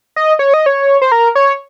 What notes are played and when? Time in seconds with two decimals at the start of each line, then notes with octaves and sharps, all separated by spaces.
0.16 D#5
0.39 C#5
0.54 D#5
0.66 C#5
1.02 C5
1.12 A#4
1.35 C#5